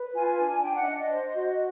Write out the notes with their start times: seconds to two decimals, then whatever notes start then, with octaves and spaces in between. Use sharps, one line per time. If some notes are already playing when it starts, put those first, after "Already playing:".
Already playing: B4
0.15 F4 G#5
0.39 D4
0.62 D4 G5
0.75 F#5
0.82 E5
0.86 D4 D#5
0.98 D#5
1.10 C5
1.33 F#4